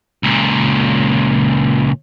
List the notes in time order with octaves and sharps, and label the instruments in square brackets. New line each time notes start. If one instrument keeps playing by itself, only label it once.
[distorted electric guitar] C#2 A#2